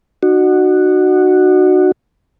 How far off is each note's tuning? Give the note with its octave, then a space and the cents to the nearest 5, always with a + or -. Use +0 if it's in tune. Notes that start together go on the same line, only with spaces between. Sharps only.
D#4 -45 F#4 +0